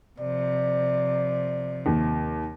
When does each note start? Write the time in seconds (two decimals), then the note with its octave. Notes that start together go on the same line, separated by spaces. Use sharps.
0.20 C3 F3 D5
1.86 D#2